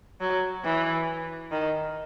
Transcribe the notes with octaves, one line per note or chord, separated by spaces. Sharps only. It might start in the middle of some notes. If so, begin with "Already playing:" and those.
F#3
E3
D#3